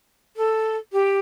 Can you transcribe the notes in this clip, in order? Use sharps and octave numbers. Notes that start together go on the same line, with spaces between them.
A4
G4